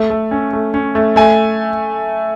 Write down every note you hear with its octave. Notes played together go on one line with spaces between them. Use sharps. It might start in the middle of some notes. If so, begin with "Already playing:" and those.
Already playing: A3
A3
C#4
A3
C#4
A3
A3 G#5